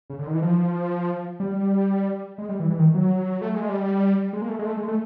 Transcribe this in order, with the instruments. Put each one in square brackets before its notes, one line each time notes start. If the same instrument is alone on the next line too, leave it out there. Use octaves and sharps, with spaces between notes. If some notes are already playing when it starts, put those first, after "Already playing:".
[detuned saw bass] C#3
D3
D#3
E3
F3
G3
G#3
G3
E3
E3
D#3
F#3
A3
G#3
G3
G#3
A#3
A3
G#3
A3
G#3
A3